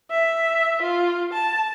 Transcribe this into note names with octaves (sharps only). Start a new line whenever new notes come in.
E5
F4
A5